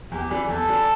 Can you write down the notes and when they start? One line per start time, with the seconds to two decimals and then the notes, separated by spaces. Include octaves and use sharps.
0.11 E2 G4
0.31 E3 G3
0.48 E2 A4
0.68 E3 G3